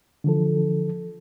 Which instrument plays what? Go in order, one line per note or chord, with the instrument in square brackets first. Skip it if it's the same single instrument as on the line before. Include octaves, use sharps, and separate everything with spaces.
[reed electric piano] D3 E3 F3 A4